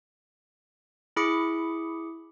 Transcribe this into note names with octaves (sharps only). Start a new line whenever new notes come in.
E4 G#4 B5 D6 C#7